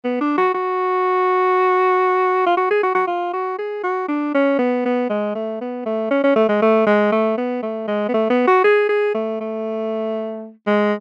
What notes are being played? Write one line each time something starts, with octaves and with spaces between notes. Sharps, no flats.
B3
D4
F#4
F#4
F4
F#4
G#4
F#4
F#4
F4
F#4
G#4
F#4
D4
C#4
B3
B3
G#3
A3
B3
A3
C#4
C#4
A3
G#3
A3
G#3
A3
B3
A3
G#3
B3
A3
B3
F#4
G#4
G#4
A3
A3
G#3